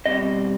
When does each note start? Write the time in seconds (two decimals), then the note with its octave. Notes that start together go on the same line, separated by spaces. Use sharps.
0.06 B2 G3 C4 D#5